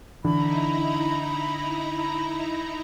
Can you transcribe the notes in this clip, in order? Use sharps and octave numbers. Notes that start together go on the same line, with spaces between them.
D3 E3 D#4 E4 A#5 B5